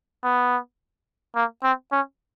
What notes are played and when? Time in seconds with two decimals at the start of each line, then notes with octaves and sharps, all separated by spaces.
0.24 B3
1.36 A#3
1.63 C4
1.92 C#4